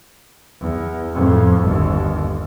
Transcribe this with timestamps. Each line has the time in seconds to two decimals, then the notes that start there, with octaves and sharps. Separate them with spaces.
0.61 E2
1.13 F2 A2
1.62 G1 D#2